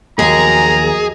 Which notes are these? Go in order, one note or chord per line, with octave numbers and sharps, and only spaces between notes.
D#2 F3 F#3 G#4 A#4 G#5 A#5